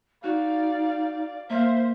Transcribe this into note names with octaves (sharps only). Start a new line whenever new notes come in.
D#4 F#4 D5 F5
A#3 C5 E5 F5